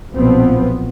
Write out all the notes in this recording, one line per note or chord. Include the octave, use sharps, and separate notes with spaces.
B1 A#2 F3 B3 C4